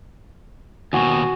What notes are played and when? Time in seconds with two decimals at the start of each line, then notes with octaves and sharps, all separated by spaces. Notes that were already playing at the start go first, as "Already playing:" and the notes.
0.93 D#2 B2 F#4 G#5